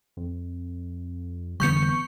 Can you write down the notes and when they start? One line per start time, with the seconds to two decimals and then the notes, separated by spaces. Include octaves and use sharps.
0.17 F2
1.60 F1 D3 E3 G3 B3 C#6 G6 C#7